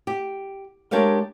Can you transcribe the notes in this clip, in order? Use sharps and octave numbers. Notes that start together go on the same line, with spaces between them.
G4
G#3 D4 G4 A#4 C#5 F5